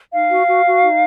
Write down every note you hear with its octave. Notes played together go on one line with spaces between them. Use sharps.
D#4 F5
F#4
F#4
F#4
D#4